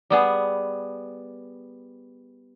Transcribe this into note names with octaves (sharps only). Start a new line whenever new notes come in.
G3 B3 G#4